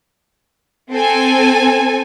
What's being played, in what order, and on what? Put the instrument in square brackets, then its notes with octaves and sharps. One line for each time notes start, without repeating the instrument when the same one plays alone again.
[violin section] C4 A4 G#5